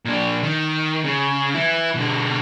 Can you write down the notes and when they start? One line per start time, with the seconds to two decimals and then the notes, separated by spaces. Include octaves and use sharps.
0.05 A#2 D4
0.43 D#3
1.04 C#3
1.54 E3 E4
1.96 B2 D3